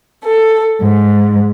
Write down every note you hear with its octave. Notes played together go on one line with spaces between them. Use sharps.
A4
G#2